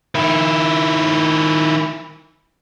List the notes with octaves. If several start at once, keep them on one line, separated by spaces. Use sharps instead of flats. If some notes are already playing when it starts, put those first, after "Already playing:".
D#3 E4